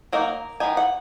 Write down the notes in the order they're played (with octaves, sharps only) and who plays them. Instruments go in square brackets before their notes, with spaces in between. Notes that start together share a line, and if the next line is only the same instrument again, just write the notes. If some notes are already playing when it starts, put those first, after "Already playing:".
[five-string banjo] F#3 A#3 D#4 A#4
D#3 G#3 B3 D#4 G#5
F#5